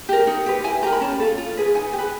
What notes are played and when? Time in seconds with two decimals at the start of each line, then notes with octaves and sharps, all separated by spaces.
0.09 G4 A#4
0.27 D#4
0.46 G4 B4
0.64 E4 G#5
0.82 G4 A#5
0.86 A#4
0.93 B5
1.01 C#4 A5
1.20 F4 A4
1.38 F4
1.57 G#4 B4
1.75 D#4 G#5
1.93 G4
1.98 B4